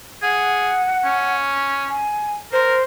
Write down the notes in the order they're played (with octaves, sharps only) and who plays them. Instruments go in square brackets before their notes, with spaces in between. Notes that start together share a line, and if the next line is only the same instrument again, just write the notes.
[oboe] G#4 [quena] F#5
[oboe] C#4
[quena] G#5
[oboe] A#4 [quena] C5